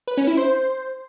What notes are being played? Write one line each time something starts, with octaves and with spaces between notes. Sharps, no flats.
B4
C#4
E4
C5